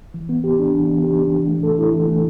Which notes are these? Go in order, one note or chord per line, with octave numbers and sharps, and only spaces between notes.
E3
B3
G4
D4
E3
B3
G4
D4
E3
A3
A4
E4
E3
A3